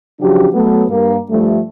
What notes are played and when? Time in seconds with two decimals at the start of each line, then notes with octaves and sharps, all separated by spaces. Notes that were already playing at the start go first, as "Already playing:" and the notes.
0.20 C#3 F3 F#3 D4 F#4 G4
0.53 F#3 A3 B3
0.89 G2 A#3
1.30 G2 F3 G3 A3